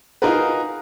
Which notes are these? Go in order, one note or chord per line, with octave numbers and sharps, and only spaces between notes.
D#4 F4 F#4 G#4 A#4 B4